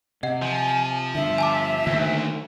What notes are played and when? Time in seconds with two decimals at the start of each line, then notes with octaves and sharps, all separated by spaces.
0.23 C3 D#5 F#5
0.42 F3 G#5
1.15 G2 D3 E5
1.38 G#5 A5 D6
1.87 D2 D3 D#3 A#3